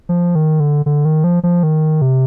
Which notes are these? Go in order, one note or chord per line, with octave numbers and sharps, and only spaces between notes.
F3
D#3
D3
D3
D#3
F3
F3
D#3
C3